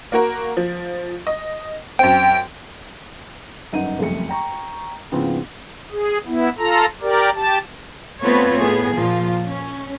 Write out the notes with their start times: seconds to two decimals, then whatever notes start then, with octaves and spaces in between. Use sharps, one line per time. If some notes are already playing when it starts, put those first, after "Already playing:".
0.12 A#3 F#4 A#4
0.57 F3
1.27 D#5
1.99 F#2 C4 G5
3.72 G1 F#2 D#4 F#5 D#7
3.99 F#1 C2 F2 A3 C#7
4.29 G5 A#5 C#6
5.12 G#2 C#3 F3 B3 C4 E4
5.92 G#4
6.27 B3 E4
6.58 F4 A4 A#5
7.02 G4 A#4 D5
7.35 G4 A5
8.22 A3 B3 C4 F4 B4 C#5
8.57 A2 B3 G#4
8.96 A#2 F3 F4
9.46 C#4